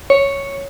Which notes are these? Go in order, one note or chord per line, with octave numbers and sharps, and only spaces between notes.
C#5